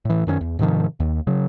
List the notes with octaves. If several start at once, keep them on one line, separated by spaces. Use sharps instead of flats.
A2 E3
F#2 D#3 B3 C#4
E2
G#2 C3 D#3 F3
D#2
C#3 F#3